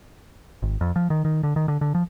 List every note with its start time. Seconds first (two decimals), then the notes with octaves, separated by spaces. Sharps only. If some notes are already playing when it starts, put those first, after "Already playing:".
0.62 G#1
0.81 F2
0.96 F3
1.10 D#3
1.25 D#3
1.43 D3
1.56 D#3
1.68 D3
1.81 D3
1.95 F3